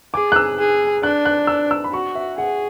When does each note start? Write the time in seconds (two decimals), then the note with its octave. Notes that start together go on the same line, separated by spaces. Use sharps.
0.14 G#4 D6
0.32 F#6
0.36 E6
0.59 G#4
1.03 D4 F#6
1.25 F#6
1.47 E6
1.71 E6
1.84 B5
1.93 F#4 C#6
2.15 E5
2.38 G#4 F#5